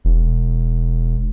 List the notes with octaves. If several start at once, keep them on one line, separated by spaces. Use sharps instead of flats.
E1